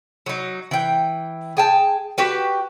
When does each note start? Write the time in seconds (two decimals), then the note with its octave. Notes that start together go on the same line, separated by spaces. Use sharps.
0.26 F#3 D#4
0.71 E3 G5
1.57 G#4 G5 A5
2.18 F#4 G4 B4